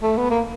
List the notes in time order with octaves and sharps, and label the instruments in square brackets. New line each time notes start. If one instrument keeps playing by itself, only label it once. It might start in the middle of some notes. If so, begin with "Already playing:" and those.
[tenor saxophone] A3
B3
A#3